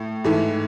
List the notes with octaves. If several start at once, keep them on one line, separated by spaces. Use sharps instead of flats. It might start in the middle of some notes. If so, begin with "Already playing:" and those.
Already playing: A2
G#2 E3 A3